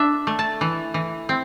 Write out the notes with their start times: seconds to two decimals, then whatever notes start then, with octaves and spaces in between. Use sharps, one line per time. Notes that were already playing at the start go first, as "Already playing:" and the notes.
Already playing: D4 E5
0.27 A3
0.39 A5
0.61 E3
0.94 E3
1.29 C4